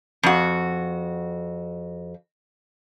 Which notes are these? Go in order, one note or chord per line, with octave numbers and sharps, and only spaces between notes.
F2 F#4